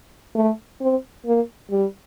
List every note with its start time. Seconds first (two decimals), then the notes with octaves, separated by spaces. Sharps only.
0.35 A3
0.81 C4
1.26 A#3
1.71 G3